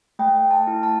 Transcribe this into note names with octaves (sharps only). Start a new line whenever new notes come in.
A3 G5
A5
E4
A5